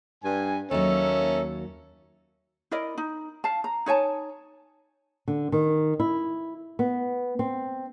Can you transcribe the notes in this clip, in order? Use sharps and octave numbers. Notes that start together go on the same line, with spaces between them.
G2 G#5
D#2 F#3 A#3 C#4 A4 E5
E4 A#4 D5 D#5
D#4
F5 A5
A#5
D#4 C#5 G#5 A5
D3
D#3
E4
B3
C4